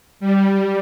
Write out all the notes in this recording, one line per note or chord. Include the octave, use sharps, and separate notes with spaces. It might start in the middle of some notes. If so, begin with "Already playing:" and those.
G3